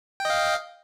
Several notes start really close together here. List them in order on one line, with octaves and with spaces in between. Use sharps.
G5 D#5 F5